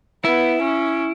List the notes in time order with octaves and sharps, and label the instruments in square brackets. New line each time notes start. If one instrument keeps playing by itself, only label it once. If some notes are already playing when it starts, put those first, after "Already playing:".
[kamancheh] B3 [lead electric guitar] E4
[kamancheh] C#4